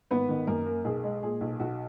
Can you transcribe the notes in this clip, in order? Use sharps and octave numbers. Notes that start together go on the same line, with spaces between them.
G#1 B3 B4
D#3
F#2 A#3 A#4
A#3
B1 G#4
G#3
A#2 G#4
B1
B1 F#4